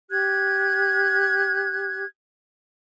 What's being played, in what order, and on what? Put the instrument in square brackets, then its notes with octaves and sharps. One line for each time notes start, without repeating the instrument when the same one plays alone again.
[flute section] G4 F#6 G#6